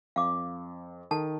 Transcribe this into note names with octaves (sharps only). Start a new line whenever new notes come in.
F2 F5 D6
D#3 A4 A5